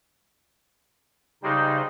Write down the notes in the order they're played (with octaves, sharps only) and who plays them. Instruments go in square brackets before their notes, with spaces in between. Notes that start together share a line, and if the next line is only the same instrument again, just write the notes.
[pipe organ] C#3 D#4 C5 [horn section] G3 G#3